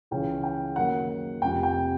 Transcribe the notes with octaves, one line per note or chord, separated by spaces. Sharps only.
C#2 C#3 E3 G#3 C#4 G5
G5
F#2 D#3 F#3 A#3 F#5
F1 F2 C3 G5
G5